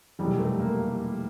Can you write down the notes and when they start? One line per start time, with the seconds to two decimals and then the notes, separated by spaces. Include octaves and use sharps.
0.19 F1 E2 B2 F#3 G3 B3
0.39 A3
0.60 A#3